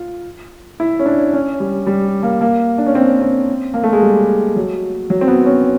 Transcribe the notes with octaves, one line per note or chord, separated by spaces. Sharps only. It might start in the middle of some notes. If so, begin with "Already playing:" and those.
Already playing: F4
E4
C#4
D4
C#4
G3
G3
A#3
A#3
D4
C#4
C4
C4
A#3
A3
G#3
G3
F#3
F#3
C4
B3
C#4